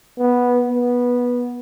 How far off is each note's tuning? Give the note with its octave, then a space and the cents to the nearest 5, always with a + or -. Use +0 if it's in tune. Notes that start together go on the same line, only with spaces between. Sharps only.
B3 -10
B3 -15